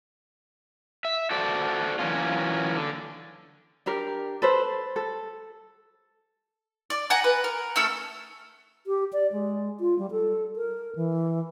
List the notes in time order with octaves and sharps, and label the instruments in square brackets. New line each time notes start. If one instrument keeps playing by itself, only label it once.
[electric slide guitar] E5
F#4 A4 C5 D5
E3 F#3 A#3 C#4 F4
D3
[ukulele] D4 G4 A#4
A4 B4 C5
A4
[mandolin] D5
F#5 G#5 A#5
B4
A#4
A3 C#4 A4 E6
[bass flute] G4
D5
G#3
F4
G3
A4
A#4
E3